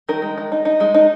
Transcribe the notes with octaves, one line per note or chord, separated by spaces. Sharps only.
D#3 A#4
G#3
D#3
D#4
D#4
G#3
D#4